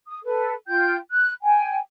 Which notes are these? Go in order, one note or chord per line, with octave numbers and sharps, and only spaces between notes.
D#6
A4 B4
F4 G5 G6
F#6
G5 G#5